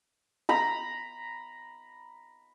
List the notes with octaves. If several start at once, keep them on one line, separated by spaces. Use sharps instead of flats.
A#5 B5